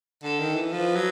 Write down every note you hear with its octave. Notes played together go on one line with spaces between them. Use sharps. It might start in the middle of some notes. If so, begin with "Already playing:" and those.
D3 A4
D#3
E3
F3 B4
F#3